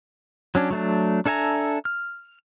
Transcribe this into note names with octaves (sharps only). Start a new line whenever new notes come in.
F#3 C#4 D4
F#3 A3 D4
D4 A4 E5 G#5 A#5
F6